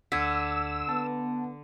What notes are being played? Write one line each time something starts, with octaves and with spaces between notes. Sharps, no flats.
D2 D3 E6 G#6 B6
B3 A5